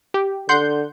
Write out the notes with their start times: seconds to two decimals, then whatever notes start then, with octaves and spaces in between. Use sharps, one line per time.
0.14 G4
0.49 D3 F#5 C6 G6